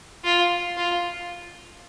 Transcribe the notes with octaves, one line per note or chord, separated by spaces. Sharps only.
F4
F4